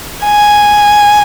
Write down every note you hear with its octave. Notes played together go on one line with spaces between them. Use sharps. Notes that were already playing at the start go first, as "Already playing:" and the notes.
G#5